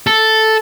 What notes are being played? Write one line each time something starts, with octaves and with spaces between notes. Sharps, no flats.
A4